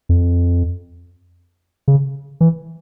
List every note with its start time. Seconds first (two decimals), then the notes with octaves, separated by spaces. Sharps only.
0.09 F2
1.88 C#3
2.41 E3